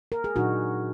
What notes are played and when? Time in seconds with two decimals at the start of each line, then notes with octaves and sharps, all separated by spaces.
0.12 A#4
0.24 G#4
0.36 A#2 F#3 D4 D#4 F#4